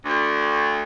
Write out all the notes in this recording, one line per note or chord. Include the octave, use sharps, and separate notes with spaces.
D2